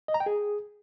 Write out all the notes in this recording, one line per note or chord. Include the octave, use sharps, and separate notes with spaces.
D#5
A#5
G5
G#4